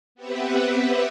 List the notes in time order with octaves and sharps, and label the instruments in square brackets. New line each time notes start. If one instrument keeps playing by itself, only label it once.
[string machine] B3 C4 G4 B4 E5 F#5